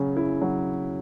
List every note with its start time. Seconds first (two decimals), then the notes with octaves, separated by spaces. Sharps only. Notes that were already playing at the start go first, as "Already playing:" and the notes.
Already playing: C#3 F#3 C#4
0.17 E4
0.41 F#3